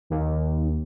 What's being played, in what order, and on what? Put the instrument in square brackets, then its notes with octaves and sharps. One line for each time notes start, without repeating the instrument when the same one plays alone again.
[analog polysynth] D#2